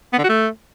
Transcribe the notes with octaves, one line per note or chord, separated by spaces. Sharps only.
B3
D3
F#4
A3